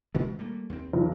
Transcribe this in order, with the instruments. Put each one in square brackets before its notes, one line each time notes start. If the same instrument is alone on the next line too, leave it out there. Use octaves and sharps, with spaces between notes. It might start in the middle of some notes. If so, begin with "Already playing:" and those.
[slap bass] A#2 D#3 G#3
G3 A3 A#3
D#2 C4
[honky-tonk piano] B1 E2